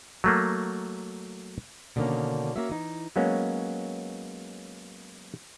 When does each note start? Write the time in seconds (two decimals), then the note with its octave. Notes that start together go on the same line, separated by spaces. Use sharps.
0.24 F#3 A3 A#3
1.96 B2 D3 D#3 G3 A#3 C#4
2.56 A#3 C#4 F#4 E5
2.69 E3 D#4
3.16 F#3 G#3 A#3 B3 C#4